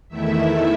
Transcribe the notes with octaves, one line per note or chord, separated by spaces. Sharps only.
E2 D#3 A3 E4 E5